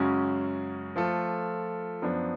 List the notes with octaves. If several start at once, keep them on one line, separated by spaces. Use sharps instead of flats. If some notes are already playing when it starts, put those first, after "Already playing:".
Already playing: F#2 C#3 G#3 C#4 F#4
F3 A3 F4 A4
F#2 F3 B3 D4